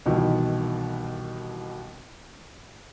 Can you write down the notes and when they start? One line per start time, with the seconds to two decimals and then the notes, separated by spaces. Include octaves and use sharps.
0.06 C2 B2 D#3 E3